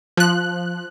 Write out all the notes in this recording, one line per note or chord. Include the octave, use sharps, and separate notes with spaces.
F3 F#6